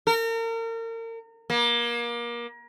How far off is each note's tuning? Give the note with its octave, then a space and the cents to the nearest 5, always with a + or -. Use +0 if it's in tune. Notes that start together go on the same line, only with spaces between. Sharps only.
A#4 -35
A#3 +30